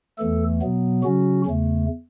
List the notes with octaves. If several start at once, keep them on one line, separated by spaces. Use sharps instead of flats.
E2 E3 A3 A4
B2 F#3 B3
C#3 F#3 C#4 F#4
E2 C#3 A3